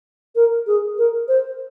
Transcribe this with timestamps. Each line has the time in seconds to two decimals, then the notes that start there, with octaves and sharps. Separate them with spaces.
0.35 A#4
0.67 G#4
0.98 A#4
1.28 C5